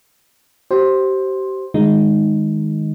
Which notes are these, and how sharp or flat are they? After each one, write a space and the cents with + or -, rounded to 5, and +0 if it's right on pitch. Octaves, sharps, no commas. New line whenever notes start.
G4 -30 C5 +10
D#3 +0 G#3 +0 D#4 +0